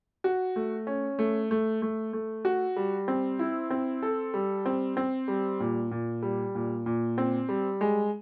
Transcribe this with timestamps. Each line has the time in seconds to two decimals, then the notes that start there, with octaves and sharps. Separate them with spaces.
0.24 F#4
0.56 A3
0.87 C#4
1.19 A3
1.51 A3
1.82 A3
2.13 A3
2.45 F#4
2.76 G3
3.08 C4
3.39 E4
3.70 C4
4.02 A4
4.34 G3
4.66 C4
4.97 C4
5.28 G3
5.60 A#2
5.91 A#2
6.23 G3
6.55 A#2
6.86 A#2
7.18 C4
7.49 G3
7.81 G#3